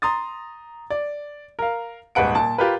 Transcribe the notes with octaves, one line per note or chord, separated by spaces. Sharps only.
A#5 C6 D#6 A6
D5
A#4 F5
D#1 G#2 B4 F#5 D7
A#2 A5
F4 G4 A#4 B4